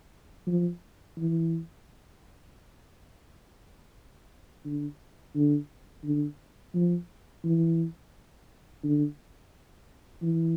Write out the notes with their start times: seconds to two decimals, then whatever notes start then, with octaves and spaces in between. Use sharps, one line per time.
0.47 F3
1.17 E3
4.65 D3
5.35 D3
6.04 D3
6.74 F3
7.44 E3
8.83 D3
10.22 E3